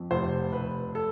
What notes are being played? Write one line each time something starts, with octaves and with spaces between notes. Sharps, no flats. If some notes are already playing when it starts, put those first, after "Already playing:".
Already playing: F2
F1 C5
F1 B4
A4